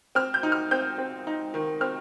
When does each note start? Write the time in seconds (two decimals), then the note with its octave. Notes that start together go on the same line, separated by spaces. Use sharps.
0.15 C4 F6
0.34 G6
0.43 D#4
0.52 F6
0.71 C4 G6
0.98 C4
1.27 D#4
1.54 D#3
1.81 C4 F6